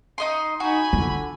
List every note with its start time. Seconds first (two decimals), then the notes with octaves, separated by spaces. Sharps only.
0.18 D#4 D#5 C6
0.60 D#4 F#4 G#5 B5
0.93 D3 F4